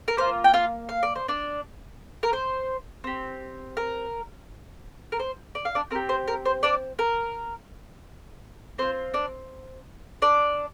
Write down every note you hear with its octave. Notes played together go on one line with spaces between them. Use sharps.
A#4
A#3 F4 C5
G5
F4 F5
F5
D5
C5
D4 D5
A#4
C5
C4 G4
A#4
A#4
C5
D5
F5
D4 D5
C4 G4 A#4
C5
A#4
C5
D4 D5
A#4
C4 F4 C5
D4 D5
D4 D5